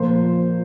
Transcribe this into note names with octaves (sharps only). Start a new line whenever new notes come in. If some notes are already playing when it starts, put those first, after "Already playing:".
Already playing: A#2 F3 A#3 C5